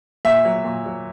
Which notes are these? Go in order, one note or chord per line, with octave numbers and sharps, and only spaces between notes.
A#2 E5
F#3
A#2
F#3